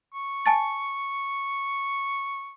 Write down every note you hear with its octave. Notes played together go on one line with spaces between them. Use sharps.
C#6
G#5 A5 A6